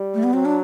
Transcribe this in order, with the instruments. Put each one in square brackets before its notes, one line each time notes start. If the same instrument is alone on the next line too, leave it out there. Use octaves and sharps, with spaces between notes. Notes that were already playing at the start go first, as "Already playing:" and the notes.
Already playing: [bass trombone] G3
[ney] A3
B3
[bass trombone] F#3 [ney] C4
[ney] D4